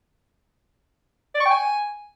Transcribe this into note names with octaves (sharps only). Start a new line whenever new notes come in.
D5
C#6
G5
G#5